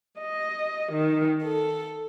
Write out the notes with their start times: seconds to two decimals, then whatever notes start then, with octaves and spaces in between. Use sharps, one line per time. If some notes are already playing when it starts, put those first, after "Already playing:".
0.19 D#5
0.91 D#3
1.42 A4